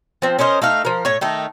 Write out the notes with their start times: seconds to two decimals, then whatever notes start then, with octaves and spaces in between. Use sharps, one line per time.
0.22 F3 C4
0.39 C#4 A#4 C5 D#5
0.62 A3 D#4 F5
0.85 F3 A#4
1.05 A2 C#5
1.21 D#3 A3 D#4